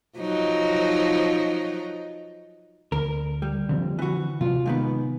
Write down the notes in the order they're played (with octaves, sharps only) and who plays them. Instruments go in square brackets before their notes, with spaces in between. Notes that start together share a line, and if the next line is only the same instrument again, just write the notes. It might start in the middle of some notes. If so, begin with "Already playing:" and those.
[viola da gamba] F3 F#3 D#4
[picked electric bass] D2 [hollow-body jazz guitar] A#4
[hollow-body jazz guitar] G3
[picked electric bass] D3 F3 C4
[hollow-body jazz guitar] E3 F#4
[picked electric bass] C3 F#3 [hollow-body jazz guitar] F4
[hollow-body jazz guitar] G#2 D#3 B3